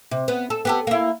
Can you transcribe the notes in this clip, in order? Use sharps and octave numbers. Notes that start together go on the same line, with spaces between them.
C3
B3
A4
B3 G4 A4
A#3 E4